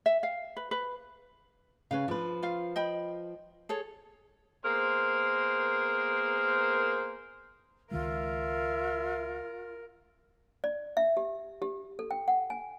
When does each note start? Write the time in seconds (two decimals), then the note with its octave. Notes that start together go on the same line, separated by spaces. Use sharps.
0.06 E5
0.23 F5
0.57 B4
0.71 B4
1.91 C#3 C#4 B4 F5
2.08 F3 D4 B4
2.43 F4 F5
2.76 D#5 G5 B5
3.69 G#4 A4 C#5
4.64 A#3 B3 G#4 A#4 C5
7.91 C#2 D#3 G#3 F4 A#4 E5
10.64 D5
10.97 E5
11.17 G4
11.62 G4
11.99 A4
12.11 G5
12.28 F#5
12.50 G#5